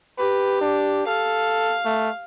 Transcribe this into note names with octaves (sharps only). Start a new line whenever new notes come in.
G4 B4
D4
A4 F5
A3